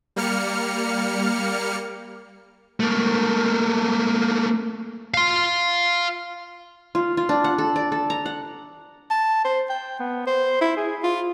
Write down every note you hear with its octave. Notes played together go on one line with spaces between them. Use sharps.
G3 A#3 F6 C#7
A3 A#3
F5 C6
F4
F4
D4
F#5
A4
D5
A4
A#5
F#5
A5
C5
G5
B3
C5
E4
G#4
F4